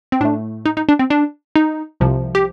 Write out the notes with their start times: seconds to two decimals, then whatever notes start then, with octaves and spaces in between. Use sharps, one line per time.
0.12 C4
0.20 A2 A3 D4
0.66 D#4
0.77 D#4
0.89 D4
0.99 C4
1.10 D4
1.56 D#4
2.00 C2 C3 F3
2.35 G4